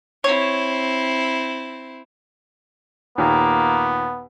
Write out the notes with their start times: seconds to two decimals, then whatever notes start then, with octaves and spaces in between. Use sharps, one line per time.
0.24 C4 E4 C#5
3.18 D#2 A#2 D#3 A#3 B3